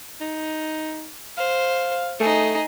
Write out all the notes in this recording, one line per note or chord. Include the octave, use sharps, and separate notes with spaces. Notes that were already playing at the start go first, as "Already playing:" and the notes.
D#4
C5 F5
A3 D#4 G#4